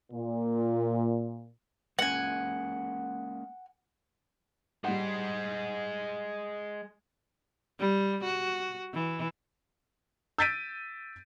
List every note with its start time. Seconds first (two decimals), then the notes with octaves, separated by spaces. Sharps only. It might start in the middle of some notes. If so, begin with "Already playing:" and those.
0.11 A#2
1.99 G#3 A#3 C#4 F#5 G#5
4.84 G3 G#3 C5 F#5
7.80 G3
8.24 F#4
8.94 E3
10.38 E6 G6 A6 B6 D7 D#7